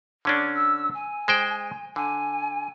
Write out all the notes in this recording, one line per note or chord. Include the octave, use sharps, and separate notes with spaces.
D3 C#4 D4
E6
G#5
G#3 C5 G5
D3 G#5